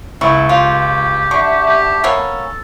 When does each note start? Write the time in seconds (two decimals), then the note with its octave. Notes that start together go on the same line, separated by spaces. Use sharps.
0.21 C#2 E4 C#6
0.49 F4 G4
1.31 D3 E5 A5 C#6
1.67 G4
2.04 A#3 B3 C#4 A4